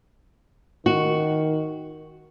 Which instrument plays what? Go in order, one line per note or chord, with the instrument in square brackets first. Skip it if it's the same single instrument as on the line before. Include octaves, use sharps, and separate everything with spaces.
[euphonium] D#3 [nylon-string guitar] F#4